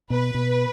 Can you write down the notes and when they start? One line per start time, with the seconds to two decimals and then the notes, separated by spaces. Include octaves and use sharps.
0.10 B2 B4
0.34 B2